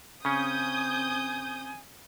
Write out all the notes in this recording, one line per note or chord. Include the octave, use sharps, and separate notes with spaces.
C#3 C4 C#4 G#5 D#6 G6